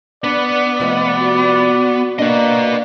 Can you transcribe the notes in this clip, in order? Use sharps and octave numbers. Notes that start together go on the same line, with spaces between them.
B3 D4 D5
C3 F3 A3 D#5
F#4
A#3 D4 B4 D#5